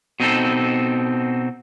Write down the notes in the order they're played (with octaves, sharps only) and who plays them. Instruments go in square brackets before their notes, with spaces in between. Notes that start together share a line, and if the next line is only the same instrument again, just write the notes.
[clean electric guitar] B2 C4 D#4 A4